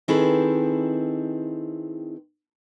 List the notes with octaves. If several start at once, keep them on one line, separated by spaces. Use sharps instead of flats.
D#3 C4 E4 G#4 A4 B4